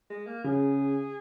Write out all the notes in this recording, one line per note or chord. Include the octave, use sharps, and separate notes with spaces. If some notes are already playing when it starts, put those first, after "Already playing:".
G#3
A#3
C#3 G#4